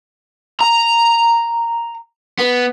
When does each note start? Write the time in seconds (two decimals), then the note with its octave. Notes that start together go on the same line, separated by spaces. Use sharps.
0.61 A#5
2.39 B3